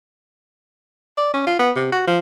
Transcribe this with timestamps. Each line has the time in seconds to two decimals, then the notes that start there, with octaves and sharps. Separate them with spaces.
1.17 D5
1.34 C#4
1.47 F4
1.59 B3
1.76 C3
1.92 F#4
2.07 F3